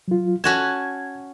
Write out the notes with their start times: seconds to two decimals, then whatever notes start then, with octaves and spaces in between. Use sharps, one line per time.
0.08 F#3 F4
0.44 C#4 F#4 A5 G#6